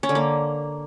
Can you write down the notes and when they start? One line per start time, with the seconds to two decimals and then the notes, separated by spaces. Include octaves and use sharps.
0.03 C#4
0.09 D3
0.15 A#3